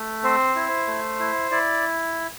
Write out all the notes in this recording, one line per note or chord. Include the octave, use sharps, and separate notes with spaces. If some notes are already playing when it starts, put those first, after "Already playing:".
Already playing: A3
C4 C5
E4
A3
E4
E4 D5